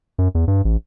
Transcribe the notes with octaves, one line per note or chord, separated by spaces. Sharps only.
F#2
E2
G2
A1